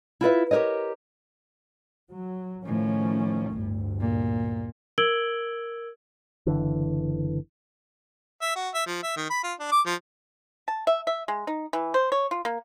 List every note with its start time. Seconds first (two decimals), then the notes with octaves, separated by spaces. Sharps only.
0.21 E4 F4 B4 E5
0.51 G4 A#4 B4 C#5 D#5
2.12 F#3
2.66 A2 D#3 F3 C#4
3.54 G1 D2 G2
4.00 A#2
4.98 A#4 E6 G#6 D7 F#7 G7
6.47 F#1 D3 E3
8.42 E5
8.56 F#4
8.74 E5
8.87 F3
9.03 E5
9.17 D#3
9.30 B5
9.44 F4
9.60 D4
9.72 D6
9.86 F3
10.68 A5
10.87 E5
11.07 E5
11.28 G#3
11.47 D#4
11.73 E3
11.94 C5
12.12 C#5
12.31 F4
12.45 A#3